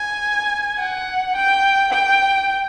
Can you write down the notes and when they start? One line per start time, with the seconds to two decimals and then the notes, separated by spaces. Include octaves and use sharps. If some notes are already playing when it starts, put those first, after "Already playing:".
Already playing: G#5
0.79 F#5
1.36 G5
1.93 G5